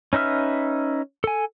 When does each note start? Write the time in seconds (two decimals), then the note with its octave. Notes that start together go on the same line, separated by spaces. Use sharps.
0.13 C#4 D#4 B4 E5 F6
1.24 A4 G#5